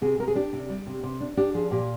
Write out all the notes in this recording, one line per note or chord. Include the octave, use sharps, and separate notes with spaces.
C3 G#4
C3 A#4
G#4
D4 G4
C3
G3
C3
C3
D4
D4 G4
F3 G#4
A#2 G4